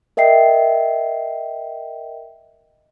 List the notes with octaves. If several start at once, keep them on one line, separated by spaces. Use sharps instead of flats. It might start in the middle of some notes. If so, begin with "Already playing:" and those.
A#4 D#5 E5 G5 C7